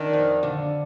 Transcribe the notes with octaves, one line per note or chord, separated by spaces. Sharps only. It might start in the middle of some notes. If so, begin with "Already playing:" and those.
Already playing: D#3 D4
F2
D3